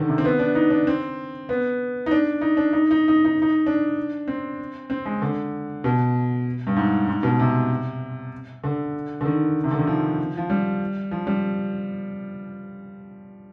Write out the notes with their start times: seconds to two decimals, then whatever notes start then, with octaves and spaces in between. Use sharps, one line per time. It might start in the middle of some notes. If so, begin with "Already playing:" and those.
Already playing: D3 D#3
0.08 C3
0.18 C4
0.25 B3
0.39 D4
0.55 D#4
0.70 D4
0.87 C4
1.49 B3
2.06 D#4
2.11 D4
2.41 D#4
2.57 D4
2.73 D#4
2.91 D#4
3.08 D#4
3.25 D#4
3.42 D#4
3.66 D4
4.28 C4
4.90 C4
5.05 G#3
5.22 D3
5.84 B2
6.67 G2
6.76 G#2
7.08 G#2
7.23 B2
7.39 C3
8.64 D3
9.21 D3
9.25 D#3
9.64 C3
9.71 D3
9.79 D#3
9.87 F3
10.37 F3
10.50 G3
11.11 F3
11.27 G3